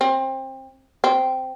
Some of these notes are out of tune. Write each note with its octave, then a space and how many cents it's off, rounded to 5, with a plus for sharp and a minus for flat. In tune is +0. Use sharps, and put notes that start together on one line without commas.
C4 +25
C4 -10